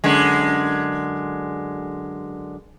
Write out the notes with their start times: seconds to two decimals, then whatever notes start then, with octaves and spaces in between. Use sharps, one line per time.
0.04 F#2 D3 G#3